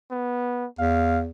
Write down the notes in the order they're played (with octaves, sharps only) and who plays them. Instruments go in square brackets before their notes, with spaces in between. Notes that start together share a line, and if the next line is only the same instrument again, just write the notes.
[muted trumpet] B3
[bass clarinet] E2 [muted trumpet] F5